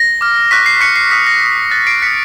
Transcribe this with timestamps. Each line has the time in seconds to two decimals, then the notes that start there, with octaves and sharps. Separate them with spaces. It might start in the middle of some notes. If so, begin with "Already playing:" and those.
Already playing: A#6
0.21 D6 F6
0.51 C#6 F#6 B6
0.66 C7
0.81 C#6 F#6 B6 C#7
0.96 C7
1.11 D#6 F#6 B6
1.26 A#6
1.42 D#6 F#6
1.71 D#6 F#6 A6
1.87 C7 D7
2.02 D#6 F#6 B6 C#7